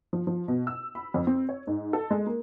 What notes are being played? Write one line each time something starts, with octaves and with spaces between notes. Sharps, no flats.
F3
F3
B2
E6
B5
F2
C4
C#5
G#2
A4
G#3
A#3